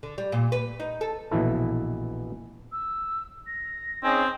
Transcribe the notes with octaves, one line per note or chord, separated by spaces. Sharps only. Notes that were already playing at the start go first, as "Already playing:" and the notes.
D3
G3
A#2
B4
D#4
A4
A#1 B2 E3 E4 A4
E6
A#6
C4 C#4 D#4 G#4